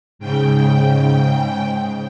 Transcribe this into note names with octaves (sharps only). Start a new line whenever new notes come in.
G#2 C#3 G5